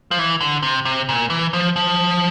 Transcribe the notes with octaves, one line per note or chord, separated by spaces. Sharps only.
F3
E3
D3
C3
C3
A#2
E3
F3
F3